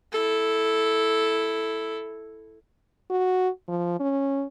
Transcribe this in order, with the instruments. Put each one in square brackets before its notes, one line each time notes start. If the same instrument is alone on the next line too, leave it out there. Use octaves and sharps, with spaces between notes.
[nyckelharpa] E4 A4
[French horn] F#4
F3
C#4